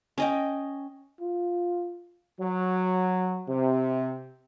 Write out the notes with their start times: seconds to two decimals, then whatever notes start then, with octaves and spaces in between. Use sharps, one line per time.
0.18 C#4 D#5 G5
1.20 F4
2.40 F#3
3.48 C3